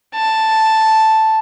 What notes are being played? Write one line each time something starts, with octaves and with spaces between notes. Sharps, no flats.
A5